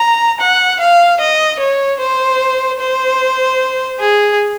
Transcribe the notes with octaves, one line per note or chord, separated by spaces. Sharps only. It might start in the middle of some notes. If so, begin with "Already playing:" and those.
Already playing: A#5
F#5
F5
D#5
C#5
C5
C5
G#4